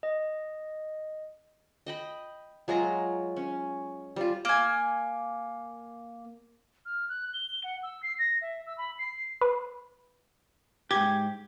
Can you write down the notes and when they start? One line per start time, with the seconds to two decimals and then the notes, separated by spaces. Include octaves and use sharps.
0.03 D#5
1.86 D#5 G5 B5
2.68 F#3 G#3 F4 A#5
3.36 C#4
4.16 G3 F4
4.45 A#3 G#5
6.85 F6
7.09 F#6
7.33 G7
7.63 F#5
7.83 E6
8.02 C7
8.18 A#6
8.41 E5
8.66 E6
8.78 B5
8.98 C7
9.41 B4
10.91 G#2 G4 G#6